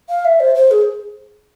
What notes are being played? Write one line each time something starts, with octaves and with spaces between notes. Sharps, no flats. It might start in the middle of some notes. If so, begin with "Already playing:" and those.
F5
E5
C5
C5
G#4